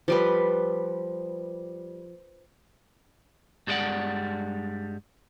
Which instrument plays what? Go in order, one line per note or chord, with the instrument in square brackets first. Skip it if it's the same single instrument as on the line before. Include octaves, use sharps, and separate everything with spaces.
[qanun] F3 G3 B4
[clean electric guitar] G2 G3 G#3 D4 D5 F#5